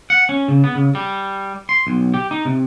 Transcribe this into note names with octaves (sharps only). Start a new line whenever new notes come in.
F#5
C#4
C#3
B3
C#3
G3
C6
B1
G4
D#4
C3